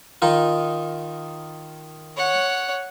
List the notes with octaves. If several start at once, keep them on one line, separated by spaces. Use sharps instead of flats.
D#3 D#4 F4
C#5 F#5